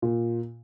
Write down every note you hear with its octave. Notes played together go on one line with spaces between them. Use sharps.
A#2